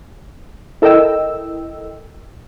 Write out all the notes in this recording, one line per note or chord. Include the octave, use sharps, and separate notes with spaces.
E4 A4 A#4 D#5 G5 E6